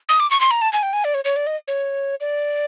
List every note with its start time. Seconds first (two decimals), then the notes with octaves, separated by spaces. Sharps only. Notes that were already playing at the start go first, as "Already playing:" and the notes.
0.09 D#6
0.20 D6
0.31 C#6
0.41 C6
0.51 A#5
0.62 A5
0.73 G#5
0.83 G5
0.93 G#5
1.04 D5
1.14 C#5
1.25 C#5
1.36 D5
1.47 D#5
1.68 C#5
2.21 D5